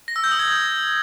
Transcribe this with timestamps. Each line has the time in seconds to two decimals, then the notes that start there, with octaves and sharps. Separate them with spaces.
0.08 A#6
0.16 E6
0.24 G6
0.31 D#6
0.39 G#6